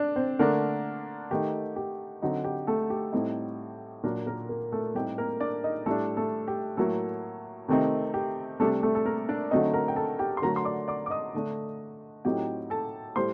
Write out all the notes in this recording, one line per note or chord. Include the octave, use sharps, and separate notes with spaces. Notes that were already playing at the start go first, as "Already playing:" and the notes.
Already playing: D4 D5
C4 C5
D3 A3 A#3 D4 A#4
D#3 A3 D#4 G4
G4
D3 F#3 C4 D#4
G4
A3 A4
G4
A2 G3 C4 D#4
A#2 F#3 A#3 D4 A#4
A#3 A#4
A#3 A#4
A3 A4
A2 G3 C4 D#4 G4
A#3 A#4
D4 D5
D#4 D#5
A2 G3 A3 D4 A4
A3 A4
G4
A2 F#3 A3 A#3 A4
C3 D#3 A3 C4 D#4 G4
G4
C3 G3 A3 D4 A4
A3 A4
A4
A#3 A#4
D4 D5
D3 F#3 A3 C4 D#4 D#5
A#4 A#5
G5
A4 A5
G4 G5
C6
D3 F#3 A3 A#4 A#5
C6
D5 D6
D5 D6
D6
D#5 D#6
D3 A3 D4
A2 F#3 C4 D#4 G4 G5
A4 A5
A2 G3 C5 C6